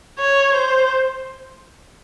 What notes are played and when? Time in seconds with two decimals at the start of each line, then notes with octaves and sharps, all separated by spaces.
0.19 C#5
0.54 C5